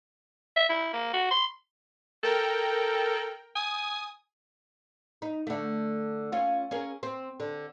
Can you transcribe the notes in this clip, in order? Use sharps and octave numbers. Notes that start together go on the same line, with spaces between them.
E5
E4
A#3
F#4
C6
A4 A#4 G5
G#5 D#6
D#4
D3 A3
C#4 F4
C#4 G#4 A#4
C4
D3